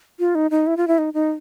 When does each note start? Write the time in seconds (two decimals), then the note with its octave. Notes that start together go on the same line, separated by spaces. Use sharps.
0.19 F4
0.35 D#4
0.51 D#4
0.67 E4
0.77 F4
0.88 E4
0.98 D#4
1.14 D#4